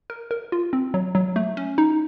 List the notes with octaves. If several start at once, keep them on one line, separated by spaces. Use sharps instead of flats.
A#4
A#4
F4
C4
F#3
F#3
A3
C#4
D#4